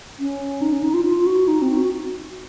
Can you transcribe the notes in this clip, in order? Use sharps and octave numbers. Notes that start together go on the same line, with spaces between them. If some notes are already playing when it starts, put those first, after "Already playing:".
C#4
D#4
C#4
D#4
F4
F4
F#4
D#4
C4
F#4